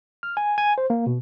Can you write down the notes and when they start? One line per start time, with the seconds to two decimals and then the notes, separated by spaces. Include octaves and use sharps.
0.23 F6
0.37 G#5
0.58 G#5
0.78 C5
0.90 A#3
1.06 B2